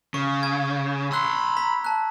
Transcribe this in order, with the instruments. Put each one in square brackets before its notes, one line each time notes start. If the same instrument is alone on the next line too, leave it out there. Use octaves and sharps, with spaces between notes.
[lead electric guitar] C#3 [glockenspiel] C#6
[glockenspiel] G#6
[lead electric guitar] B5 C6 [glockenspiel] E6 F#6
[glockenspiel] A#5 B6
A5 F#6